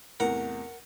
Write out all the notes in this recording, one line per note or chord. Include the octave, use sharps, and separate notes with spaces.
E2 A2 C3 A#4 F#5